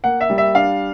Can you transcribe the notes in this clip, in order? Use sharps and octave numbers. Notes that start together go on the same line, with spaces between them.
A#3 F#5
E5
G3
E5
D4 F5